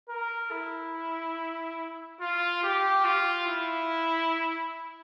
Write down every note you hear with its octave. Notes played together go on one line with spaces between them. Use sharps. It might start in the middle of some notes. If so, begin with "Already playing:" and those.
A#4
E4
F4
G4
F4
E4